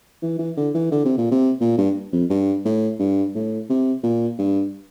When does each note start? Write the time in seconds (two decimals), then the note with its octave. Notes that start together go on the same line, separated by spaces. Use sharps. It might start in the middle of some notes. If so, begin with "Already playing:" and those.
0.22 E3
0.39 E3
0.57 D3
0.74 E3
0.92 D3
1.05 C3
1.17 A#2
1.31 C3
1.61 A#2
1.78 G2
2.12 F2
2.30 G2
2.65 A2
2.99 G2
3.35 A2
3.69 C3
4.03 A#2
4.38 G2